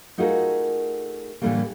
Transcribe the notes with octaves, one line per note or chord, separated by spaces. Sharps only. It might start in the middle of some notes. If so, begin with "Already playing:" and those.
A3 D#4 F4 F#4 G#4 A#4
A2 D3 E3 G3 A3 A#3